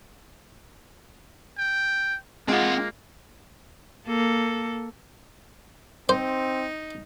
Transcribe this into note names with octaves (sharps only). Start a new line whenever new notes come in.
G5
G#3 A#3 C4 F4 F#5
A#3 A4
C4 D#4 C5